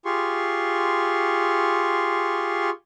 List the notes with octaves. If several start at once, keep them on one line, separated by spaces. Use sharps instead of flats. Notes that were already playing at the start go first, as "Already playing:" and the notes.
F4 G4 G#4 C6 C#6